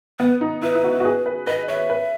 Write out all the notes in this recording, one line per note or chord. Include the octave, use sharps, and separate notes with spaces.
B3 B4
D#4
E4 B4
E4
F#4
F#4
G#4
B4
B4 D#5
C#5 E5
B4